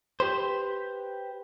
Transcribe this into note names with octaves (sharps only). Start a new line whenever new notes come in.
G4 B4 C5